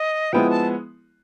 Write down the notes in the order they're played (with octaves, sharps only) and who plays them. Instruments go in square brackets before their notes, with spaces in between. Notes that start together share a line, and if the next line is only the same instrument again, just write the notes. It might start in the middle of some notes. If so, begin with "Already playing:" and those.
Already playing: [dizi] D#5
[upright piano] F3 G#3 B3 E4 [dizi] G5
[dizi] A5